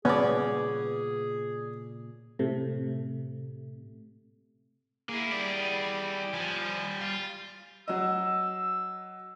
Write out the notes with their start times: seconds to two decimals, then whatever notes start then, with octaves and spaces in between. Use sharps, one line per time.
0.05 A#2 C#3 G3 B3 C#4 G#4 D5
2.39 A2 C3 A3
5.09 A#3 E4 G#4
5.32 G4 D5
6.33 F3 G3 G#5
7.01 F4
7.88 F#3 D#5 E6